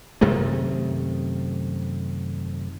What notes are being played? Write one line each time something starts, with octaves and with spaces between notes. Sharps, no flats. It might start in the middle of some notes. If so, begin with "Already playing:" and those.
F#2 C3 D#3 A3